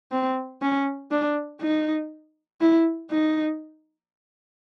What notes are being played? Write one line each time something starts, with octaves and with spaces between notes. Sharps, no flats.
C4
C#4
D4
D#4
E4
D#4